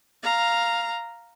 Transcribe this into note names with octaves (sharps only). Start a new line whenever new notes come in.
F5 A#5